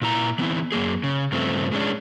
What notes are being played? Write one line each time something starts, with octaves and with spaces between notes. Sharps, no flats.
A#2 E4 A#5
E3 B3 C4 E4
F#2 A#3 G#4
C#3
G2 C#3 F3 A3 C4
A2 G#3 C#4 D4